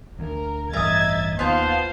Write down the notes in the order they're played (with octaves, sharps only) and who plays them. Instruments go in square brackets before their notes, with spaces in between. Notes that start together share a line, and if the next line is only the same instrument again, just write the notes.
[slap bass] D2 [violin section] A#4
[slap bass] A1 G2 [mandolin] A#4 D#6 [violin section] D#5 G#6 A6 [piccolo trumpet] E5
[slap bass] D#2 C3 D#3 [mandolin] B3 F4 A5 [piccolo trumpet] C5 [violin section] F5